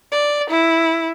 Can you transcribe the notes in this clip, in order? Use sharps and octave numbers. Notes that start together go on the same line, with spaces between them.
D5
E4